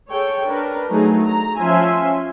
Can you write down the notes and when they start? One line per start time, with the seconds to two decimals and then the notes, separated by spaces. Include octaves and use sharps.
0.11 G#4 A4 C#5 G5
0.48 D4 A#4 B4
0.90 F#3 A3 D#4 G#4
1.26 A#5
1.59 F3 C#4 E5 G#5 C6